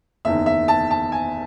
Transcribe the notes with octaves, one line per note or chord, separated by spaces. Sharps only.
F#1 E2 D#3 E5
E5
A5
A5
G#5